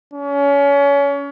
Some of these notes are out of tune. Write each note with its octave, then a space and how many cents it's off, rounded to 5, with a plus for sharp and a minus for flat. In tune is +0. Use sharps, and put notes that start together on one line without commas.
C#4 +30